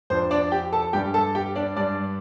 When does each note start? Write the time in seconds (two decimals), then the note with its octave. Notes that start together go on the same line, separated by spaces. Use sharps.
0.10 F2 F3 D4 C5
0.31 D4 D5
0.52 G4 G5
0.73 A4 A5
0.93 G2 G3 D4 G4 G5
1.14 A4 A5
1.35 G4 G5
1.56 D4 D5
1.76 G2 G3 D4 D5